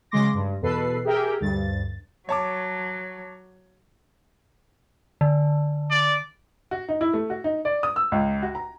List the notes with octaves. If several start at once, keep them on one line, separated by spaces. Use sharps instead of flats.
C#3 F#3 G#3 C6 D6 A#6
G2
E2 B2 A4 B4 C7
G4 G#4 A#4 E5 G5
D2 G2 A6
F#3 C#5 A5 D6
D3
D5
F#4
D#4
E4
A3
F#4
D#4
D5
D#6
E6
C#2
F#4
A#5